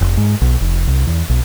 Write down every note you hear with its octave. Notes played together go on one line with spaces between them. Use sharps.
F1
G#2
B1
F1
C2
E2
B1